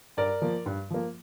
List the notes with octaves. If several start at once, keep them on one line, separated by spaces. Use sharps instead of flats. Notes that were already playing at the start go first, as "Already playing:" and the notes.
G2 A#4 D5
F3 A#3
G2
F3 A#3